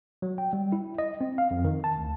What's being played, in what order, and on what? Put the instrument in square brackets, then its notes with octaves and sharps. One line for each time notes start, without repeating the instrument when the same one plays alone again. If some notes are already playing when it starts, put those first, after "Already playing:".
[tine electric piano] F#3
G5
G3
E4
D#5
C4
F5
F2
D#3
A5
D2